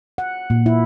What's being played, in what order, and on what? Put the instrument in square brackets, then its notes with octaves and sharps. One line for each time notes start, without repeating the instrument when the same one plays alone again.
[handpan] F#5
A#2
E4